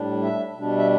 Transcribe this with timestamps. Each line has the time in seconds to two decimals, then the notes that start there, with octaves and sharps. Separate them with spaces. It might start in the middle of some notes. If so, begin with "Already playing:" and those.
Already playing: A2 G3 D4
0.22 E5
0.55 B2 G3 D4
0.78 E5